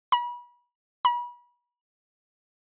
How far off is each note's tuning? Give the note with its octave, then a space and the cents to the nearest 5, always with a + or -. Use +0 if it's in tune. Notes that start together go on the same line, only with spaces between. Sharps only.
B5 -35
B5 -35